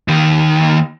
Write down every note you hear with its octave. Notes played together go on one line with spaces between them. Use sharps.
D#2 D#3